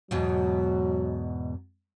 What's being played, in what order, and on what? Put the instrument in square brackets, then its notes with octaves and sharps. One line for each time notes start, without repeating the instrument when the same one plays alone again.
[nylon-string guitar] E2 G#2 B2 [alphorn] F#3